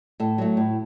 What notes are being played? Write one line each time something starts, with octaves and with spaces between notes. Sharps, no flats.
A2 A4
F#3 A3
A2